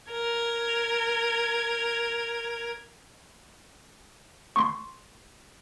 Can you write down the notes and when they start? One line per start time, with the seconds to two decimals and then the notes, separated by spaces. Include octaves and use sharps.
0.11 A#4 G#6
4.56 C6 C#6